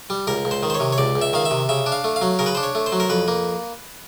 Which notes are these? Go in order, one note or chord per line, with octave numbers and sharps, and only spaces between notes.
G3
C#2 A#4
C#2
C5
D#3
C5
C#5
C3
C#5
C#2 D5
C#2
E5
D#3 F5
E5
C3
C#3 E5
D4
F5
A3
F5
F#3
C#3 A#4
B4
D4 C5
C#5
A3
C5
F#3
A#4
F2 B4
A#3